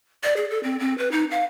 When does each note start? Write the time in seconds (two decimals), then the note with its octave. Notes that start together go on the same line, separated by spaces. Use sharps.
0.24 D5
0.37 G#4
0.51 A4
0.64 C4
0.80 C4
0.98 B4
1.12 D#4
1.31 F5